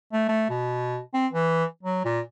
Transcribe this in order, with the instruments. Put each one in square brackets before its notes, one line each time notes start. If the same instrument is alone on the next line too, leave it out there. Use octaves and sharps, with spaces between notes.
[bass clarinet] A3
A3
B2
C4
E3
F#3
A#2